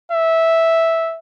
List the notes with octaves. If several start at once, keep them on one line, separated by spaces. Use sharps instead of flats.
E5